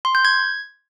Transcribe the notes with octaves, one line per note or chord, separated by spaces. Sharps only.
C6
G6
G#6